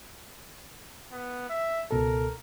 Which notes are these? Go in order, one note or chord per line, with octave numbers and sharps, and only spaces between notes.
B3
E5
C#2 B2 A4 A#4